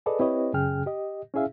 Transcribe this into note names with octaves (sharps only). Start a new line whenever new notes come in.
G#4 A4 B4 D5 D#5
C4 E4 G4 B4 C#5 D#5
F#2 C#3 C#4 G#4 G5 F6
G4 D#5
C#4 E4 G#4 E5 F5